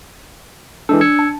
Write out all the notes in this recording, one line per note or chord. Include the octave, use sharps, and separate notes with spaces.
E3 G#3 D4 A4
E6 G#6 C#7
A5